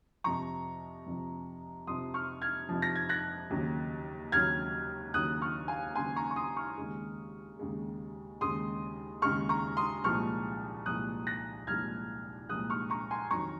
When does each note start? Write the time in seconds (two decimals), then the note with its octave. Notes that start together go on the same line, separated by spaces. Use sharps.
0.24 F2 C3 F3 A#5 C#6
1.06 F2 C3 F3
1.87 F2 C3 F3 C6 D#6
2.14 C#6 F6
2.42 F6 G#6
2.69 F2 C3 F3
2.82 A#6
2.96 G#6
3.09 F#6 A#6
3.50 D#2 C#3 F#3
4.32 D#2 C#3 F#3 F6 G#6
5.14 D#2 C#3 F#3 D#6 F#6
5.41 C#6 F6
5.68 F5 G#5
5.95 D#2 C#3 F#3 G#5 C6
6.16 A#5 C#6
6.31 C#6
6.36 C6 D#6
6.57 C#6 F6
6.78 D#2 C#3 G#3
7.59 D#2 C#3 G#3
8.41 D#2 C#3 G#3 C6 D#6
9.22 D#2 C#3 G#3 C#6 F6
9.49 A#5 C#6
9.77 C6 D#6
10.04 C2 A#2 F3 G#3 C#6 F6
10.86 C2 A#2 F3 G#3 D#6 F#6
11.27 F#6 A#6
11.67 C2 A#2 F3 G#3 F6 G#6
12.49 C2 A#2 F3 G#3 D#6 F#6
12.70 C#6 F6
12.90 A#5 C#6
13.11 G#5 C6
13.31 F2 D#3 F#3 A#5 C#6